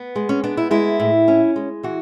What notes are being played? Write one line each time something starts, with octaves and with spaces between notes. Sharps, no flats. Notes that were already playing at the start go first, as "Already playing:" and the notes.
Already playing: B3
G#3
C#4
B3 D4
E4
G#3 E4
A2
C#4
G#3
E3 F#4